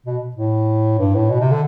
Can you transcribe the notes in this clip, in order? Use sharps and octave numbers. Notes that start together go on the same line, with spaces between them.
B2
A2
G2
A2
B2
C3
D3